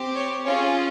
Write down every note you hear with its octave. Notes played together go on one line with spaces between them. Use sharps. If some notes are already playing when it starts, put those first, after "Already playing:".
Already playing: C4 G4
C#5
C#4 F4 G#4 C#5